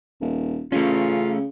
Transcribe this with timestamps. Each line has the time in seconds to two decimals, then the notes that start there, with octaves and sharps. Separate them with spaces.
0.21 D#1
0.72 C#3 A3 C#4 F4